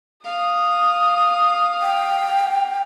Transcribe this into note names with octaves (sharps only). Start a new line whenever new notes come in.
F5 D#6
G5